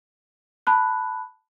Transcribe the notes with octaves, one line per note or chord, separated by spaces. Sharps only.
A5 B5 F#6